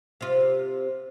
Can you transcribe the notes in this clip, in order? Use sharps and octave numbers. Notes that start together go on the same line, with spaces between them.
C3 F4